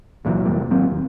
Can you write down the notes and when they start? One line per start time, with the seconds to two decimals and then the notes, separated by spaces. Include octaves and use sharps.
0.25 C#2 A#2 E3 F#3
0.45 F1 F2 G3 A#3
0.70 G#1 F#3 C4
0.91 D#2